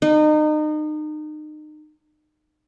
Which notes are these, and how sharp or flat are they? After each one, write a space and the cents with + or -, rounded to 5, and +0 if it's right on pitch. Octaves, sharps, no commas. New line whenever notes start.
D#4 -30